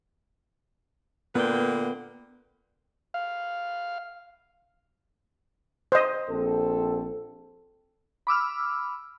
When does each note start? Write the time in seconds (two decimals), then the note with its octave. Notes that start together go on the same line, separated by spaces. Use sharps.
1.35 A#2 D3 B3 B4 G5
3.14 F5
5.92 C5 D#5
6.29 A#1 C4 A4
8.27 B5 D6 E6 F6